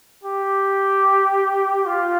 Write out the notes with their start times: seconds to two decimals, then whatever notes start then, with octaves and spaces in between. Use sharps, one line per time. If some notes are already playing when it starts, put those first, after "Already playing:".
0.24 G4
1.86 F4